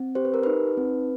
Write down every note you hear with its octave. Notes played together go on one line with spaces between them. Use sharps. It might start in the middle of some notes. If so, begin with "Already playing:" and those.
Already playing: C4
G4 C5
B4
A#4
D#4 B4
C4